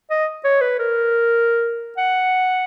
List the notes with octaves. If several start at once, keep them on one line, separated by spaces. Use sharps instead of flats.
D#5
C#5
B4
A#4
F#5